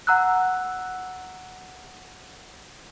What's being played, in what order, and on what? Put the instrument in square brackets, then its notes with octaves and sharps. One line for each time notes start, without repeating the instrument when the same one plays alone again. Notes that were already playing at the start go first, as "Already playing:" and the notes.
[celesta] F#5 A#5 E6 F#6